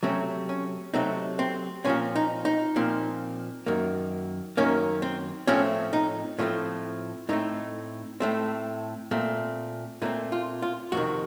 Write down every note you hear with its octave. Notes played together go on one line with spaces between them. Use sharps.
C3 F#3 A3 C4 C#4
C#4
C3 F#3 A3 C4 D#4
C4
A#2 F3 C4 C#4
D#4
D#4
A#2 F3 C4
F#2 D#3 A#3
F#2 D#3 A#3 C#4
C4
A2 F3 A3 C4 C#4
D#4
A2 F3 A3 C4 C#4
A2 A3 C4 D#4
A2 A3 C4
A#2 A3 C4
A#2 A3 C4 D#4
F4
F4
F2 C3 D#3 F#4